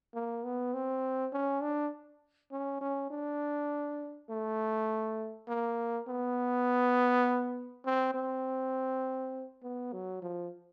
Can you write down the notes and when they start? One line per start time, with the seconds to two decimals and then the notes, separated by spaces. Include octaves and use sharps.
0.14 A#3
0.44 B3
0.74 C4
1.33 C#4
1.62 D4
2.52 C#4
2.81 C#4
3.11 D4
4.29 A3
5.48 A#3
6.08 B3
7.85 C4
8.14 C4
9.63 B3
9.93 F#3
10.22 F3